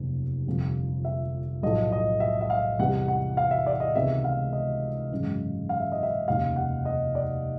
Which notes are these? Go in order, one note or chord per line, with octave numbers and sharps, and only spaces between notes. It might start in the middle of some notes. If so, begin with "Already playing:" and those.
Already playing: F1 D#2 C#3 F#3 B3
G1 F2 C3 F3
E5
B1 A2 F3 A3 D#5
D#5
E5
E5
F5
E2 C3 E3 G3 F#5
F#5
F5
E5
D5
D#5
C#2 C3 D#3 G#3 B3 E5
F5
D#5
G#1 F#2 C#3 E3
F5
E5
D#5
E5
F1 D#2 C#3 F5
F#5
D#5
D5